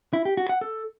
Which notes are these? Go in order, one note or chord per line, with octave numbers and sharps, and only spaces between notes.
E4
G4
F#4
F#5
A4